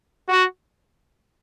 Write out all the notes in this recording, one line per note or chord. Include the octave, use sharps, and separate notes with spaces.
F#4